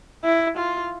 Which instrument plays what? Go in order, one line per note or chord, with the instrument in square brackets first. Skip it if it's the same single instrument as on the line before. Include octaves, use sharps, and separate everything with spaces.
[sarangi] E4
F4